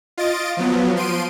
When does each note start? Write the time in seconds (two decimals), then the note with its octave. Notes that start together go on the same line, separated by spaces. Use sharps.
0.18 F4 D#5 A6 D7
0.57 F3 F#3 B3
0.96 F3 C6 D7 D#7